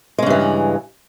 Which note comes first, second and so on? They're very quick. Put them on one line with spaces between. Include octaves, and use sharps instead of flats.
G#3 C#3 G2 E3